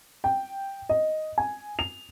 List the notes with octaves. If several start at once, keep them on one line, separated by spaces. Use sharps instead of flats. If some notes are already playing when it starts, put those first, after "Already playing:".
G5
D#5
G#5
F7